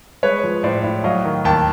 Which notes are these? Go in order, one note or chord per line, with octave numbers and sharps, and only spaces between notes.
G#3 B4 C#5
F3
A2 C5 D5
A2
F#3 D#5 F5
D#3
D#2 G5 A5